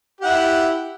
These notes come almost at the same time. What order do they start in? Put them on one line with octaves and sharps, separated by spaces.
G4 F#5 E4